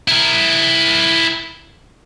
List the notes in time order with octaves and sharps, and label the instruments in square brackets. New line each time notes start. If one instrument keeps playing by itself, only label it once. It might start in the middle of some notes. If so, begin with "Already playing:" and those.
[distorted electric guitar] E4 A#4